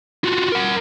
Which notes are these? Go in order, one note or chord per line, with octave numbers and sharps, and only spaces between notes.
F4 F#4
A#4 F#5